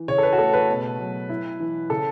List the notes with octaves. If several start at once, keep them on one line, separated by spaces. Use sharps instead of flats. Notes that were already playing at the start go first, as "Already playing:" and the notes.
Already playing: E3
C#3 C#5
A4
B4
F#4
A3 A4
B4
B2
F#3
E4
E3
C#3 A4